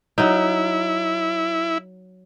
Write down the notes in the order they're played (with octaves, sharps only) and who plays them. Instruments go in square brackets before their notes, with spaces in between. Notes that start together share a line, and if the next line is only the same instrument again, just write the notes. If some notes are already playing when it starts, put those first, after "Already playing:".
[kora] F#3 D#4 [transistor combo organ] E4